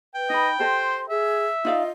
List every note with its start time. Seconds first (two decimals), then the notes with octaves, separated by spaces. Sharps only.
0.15 B4 G5
0.30 D#4 D#5 B5
0.59 G4 A4 C5 D#5 C6
1.09 G#4 E5
1.65 D#4 F4 D5 D#5 F5